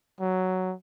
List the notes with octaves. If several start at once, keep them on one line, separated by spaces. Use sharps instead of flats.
F#3